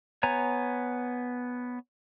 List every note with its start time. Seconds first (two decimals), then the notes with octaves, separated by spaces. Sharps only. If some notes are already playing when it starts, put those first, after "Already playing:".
0.23 B3 C#5 G#5 A#5